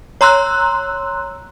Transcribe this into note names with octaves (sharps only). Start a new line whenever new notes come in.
C#5 A#5 C6 E6 F#6